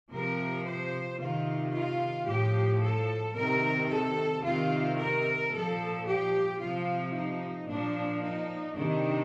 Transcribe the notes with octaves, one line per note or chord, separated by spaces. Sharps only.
C3 F3 A#4
C5
C3 D#3 F4
F4
A2 F3 G4
A4
C3 D#3 A#4
A4
C3 D#3 F4
A#4
A#2 F3 A4
G4
C3 F3 F4
D#4
A#2 F3 D4
D#4
C3 D#3 D4